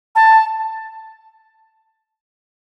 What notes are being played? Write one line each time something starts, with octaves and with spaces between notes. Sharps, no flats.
A5